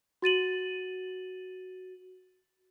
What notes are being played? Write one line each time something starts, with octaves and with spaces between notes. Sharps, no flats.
F#4 A6 D#7 F#7